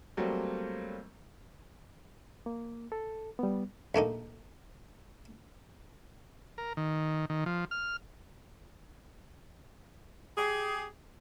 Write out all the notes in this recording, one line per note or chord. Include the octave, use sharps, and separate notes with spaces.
F#3 G3 A3 A#3 C4
A#3
A4
G3 B3
A#1 A3 A#3 D#4
A#4
D#3
D#3
F3
F6
G4 G#4